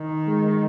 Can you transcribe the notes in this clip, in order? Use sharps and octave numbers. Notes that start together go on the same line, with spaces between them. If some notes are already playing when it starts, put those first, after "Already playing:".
Already playing: D#3
G#3